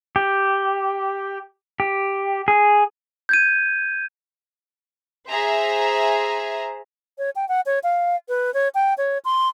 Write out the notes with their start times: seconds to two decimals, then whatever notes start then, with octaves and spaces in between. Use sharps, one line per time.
0.16 G4
1.80 G4
2.48 G#4
3.29 G6 G#6 D#7
5.29 G#4 C5 E5 A#5
7.18 C#5
7.36 G5
7.49 F#5
7.66 C#5
7.83 F5
8.29 B4
8.54 C#5
8.75 G5
8.98 C#5
9.25 C6